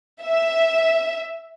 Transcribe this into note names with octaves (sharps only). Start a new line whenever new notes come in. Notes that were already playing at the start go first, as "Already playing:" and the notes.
E5